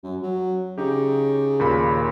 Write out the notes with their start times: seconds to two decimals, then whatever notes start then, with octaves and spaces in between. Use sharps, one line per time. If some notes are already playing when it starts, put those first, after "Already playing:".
0.03 F#2
0.22 F#3
0.78 C#3 D#4 G4
1.60 D#2 A#2 B5